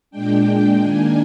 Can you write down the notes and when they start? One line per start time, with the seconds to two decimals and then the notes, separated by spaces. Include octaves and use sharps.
0.11 A#2 G#3 D4 G5
0.81 D#3 A#3 D4 G#5